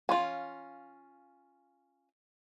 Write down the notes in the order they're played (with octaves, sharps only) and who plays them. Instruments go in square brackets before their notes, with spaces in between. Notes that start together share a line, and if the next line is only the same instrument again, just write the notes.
[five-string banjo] C#4 F4 [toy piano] F5 C6